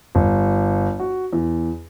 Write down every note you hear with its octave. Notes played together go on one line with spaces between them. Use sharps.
G1
F#4
E2